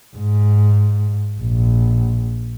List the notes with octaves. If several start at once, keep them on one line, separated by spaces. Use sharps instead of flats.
G#2
A#1